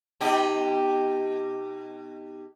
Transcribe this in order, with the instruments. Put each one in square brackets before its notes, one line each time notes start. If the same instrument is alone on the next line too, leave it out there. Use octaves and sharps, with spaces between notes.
[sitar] B2 D#4 G4